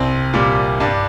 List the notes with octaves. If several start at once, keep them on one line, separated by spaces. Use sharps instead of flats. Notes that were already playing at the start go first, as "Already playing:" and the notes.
Already playing: C2 C4
A#2 G3
G2 D4